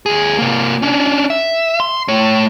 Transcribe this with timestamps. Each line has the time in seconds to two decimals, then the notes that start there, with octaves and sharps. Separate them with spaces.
0.06 D#2 G#4
0.38 C3 A#3
0.82 C#4 D4
1.30 E5
1.80 C6
2.08 A3 C#5